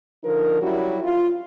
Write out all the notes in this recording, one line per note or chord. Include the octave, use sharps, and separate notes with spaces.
D3 F3 D#4 A#4
F#3 G3 C#4 E4 F#4
F4